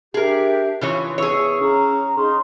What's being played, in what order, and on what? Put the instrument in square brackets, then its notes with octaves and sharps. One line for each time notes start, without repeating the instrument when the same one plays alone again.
[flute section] D4 G4 E5 [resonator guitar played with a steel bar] G#4 A#4
[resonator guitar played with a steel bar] C#3 E3 C#5 [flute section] F4
[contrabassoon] E2 [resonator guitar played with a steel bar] G#4 C#5 [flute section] E6
[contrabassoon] C#3 [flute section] A#5
[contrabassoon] C#3 [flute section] D#4 C6